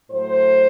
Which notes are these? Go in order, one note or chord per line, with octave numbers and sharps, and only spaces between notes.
A2 F#3 A3 C5